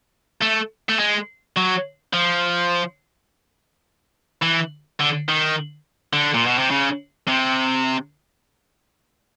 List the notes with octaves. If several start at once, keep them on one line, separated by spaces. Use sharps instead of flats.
A3
A3
G#3
F#3
F3
E3
D3
D#3
D3
A#2
B2
C3
C#3
C3